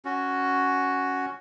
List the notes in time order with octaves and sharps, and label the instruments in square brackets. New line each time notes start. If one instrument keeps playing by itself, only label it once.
[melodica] C#4 F#4